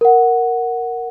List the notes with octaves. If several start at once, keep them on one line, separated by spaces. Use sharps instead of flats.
A#4 F#5